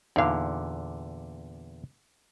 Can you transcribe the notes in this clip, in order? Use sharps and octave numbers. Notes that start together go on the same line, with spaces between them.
E2 A#2 D3 D#4 F5